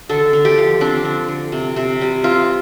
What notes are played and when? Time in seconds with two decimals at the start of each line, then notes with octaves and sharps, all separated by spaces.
0.09 D3 A4
0.33 D3
0.45 G4
0.58 F3
0.81 C4 D4
1.04 D3
1.28 D3
1.52 C3
1.76 C3
2.01 G3
2.24 C4 F4